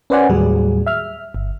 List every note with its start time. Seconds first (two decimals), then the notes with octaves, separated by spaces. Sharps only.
0.10 C#4 B4 C5 D5 F#5 G#5
0.29 D#2 A2 F#3 G3 G#4
0.87 E5 F6
1.34 G1